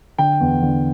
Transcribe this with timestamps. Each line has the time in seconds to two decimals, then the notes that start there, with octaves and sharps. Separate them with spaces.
0.18 D3 G5
0.41 E2
0.62 D3